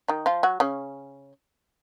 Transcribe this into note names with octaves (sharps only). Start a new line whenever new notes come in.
D#3 D#4
F3 F4
F#3 F#4
C#3 C#4